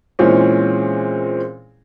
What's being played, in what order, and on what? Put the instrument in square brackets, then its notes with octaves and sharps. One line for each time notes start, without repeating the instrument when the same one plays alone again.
[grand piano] A#2 E3 G#3 C4 C#4